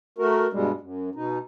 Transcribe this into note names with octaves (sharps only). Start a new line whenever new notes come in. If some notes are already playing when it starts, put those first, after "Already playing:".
A3 F#4 A#4
G2 B2 G3 G#3
F#2
B2 D#4